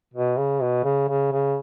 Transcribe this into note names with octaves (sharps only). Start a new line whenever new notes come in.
B2
C#3
B2
C#3
C#3
C#3